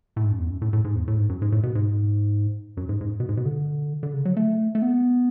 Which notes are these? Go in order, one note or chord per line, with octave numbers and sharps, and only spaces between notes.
A2
G#2
F#2
E2
F#2
A2
A2
G#2
E2
A2
G#2
F#2
G#2
A2
B2
G#2
F#2
G#2
G#2
B2
G#2
B2
D3
D3
C#3
F#3
A3
A3
B3